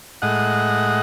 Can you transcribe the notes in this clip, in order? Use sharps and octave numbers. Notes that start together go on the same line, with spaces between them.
A2 G#3 D#5 F#5